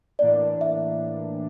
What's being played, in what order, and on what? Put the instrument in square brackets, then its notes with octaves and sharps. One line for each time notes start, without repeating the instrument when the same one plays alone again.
[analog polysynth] A2 E3 A#3 D4 [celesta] D5
[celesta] E5